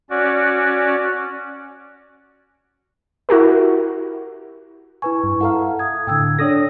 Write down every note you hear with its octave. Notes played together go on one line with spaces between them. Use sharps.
C#4 F#4 D5
E4 F#4 G4 A#4
E4 B4 G#5 C#6
G2
E4 A4 F5 F#5 A#5
D#6 G#6
A2 D3 G5 E6 G#6
D4 A4 C#5 D#6 A#6